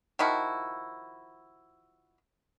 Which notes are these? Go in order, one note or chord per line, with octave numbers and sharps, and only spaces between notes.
D#3 F3 E4 F#4